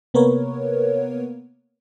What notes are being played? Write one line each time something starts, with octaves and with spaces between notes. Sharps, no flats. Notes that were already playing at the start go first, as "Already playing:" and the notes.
C3 A#3 B3 A#4 B4 C#5